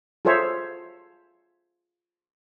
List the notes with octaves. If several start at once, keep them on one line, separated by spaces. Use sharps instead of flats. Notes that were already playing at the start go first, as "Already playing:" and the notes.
F4 G#4 A4 C5 C#5 E5